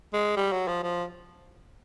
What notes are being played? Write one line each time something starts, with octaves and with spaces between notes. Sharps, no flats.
G#3
G3
F#3
F3
F3